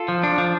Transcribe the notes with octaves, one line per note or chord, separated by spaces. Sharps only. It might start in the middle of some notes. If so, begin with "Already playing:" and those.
Already playing: F4 A4
F3
D4
F3